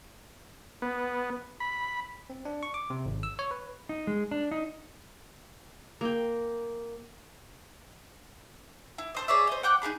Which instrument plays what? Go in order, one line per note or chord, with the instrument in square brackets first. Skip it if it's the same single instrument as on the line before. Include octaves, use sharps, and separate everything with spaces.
[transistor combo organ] B3
B5
[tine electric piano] C4
D4
C#6
D6
C3
G#1
E6
C#5
B4
[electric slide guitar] D#4
G#3
D4
D#4
[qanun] A#3 G5
[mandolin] E4
A4 C5 D#5
G#4 C#5 D5 E5
C5 D#5
F#5 G5 D6 F#6
D#4 E4 G#4 B5